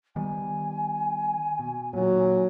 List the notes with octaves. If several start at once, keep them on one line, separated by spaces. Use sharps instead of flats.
D#3 G3 B3 G#5
B2
A#2 D#3 F#3